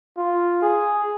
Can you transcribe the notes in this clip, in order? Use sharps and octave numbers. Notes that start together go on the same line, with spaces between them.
F4
G#4